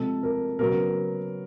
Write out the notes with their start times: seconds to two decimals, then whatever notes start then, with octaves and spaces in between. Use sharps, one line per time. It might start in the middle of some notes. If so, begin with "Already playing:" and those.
Already playing: C3 F3 G#3 C4 A4
0.23 A#4
0.59 C#3 F#3 B3 A#4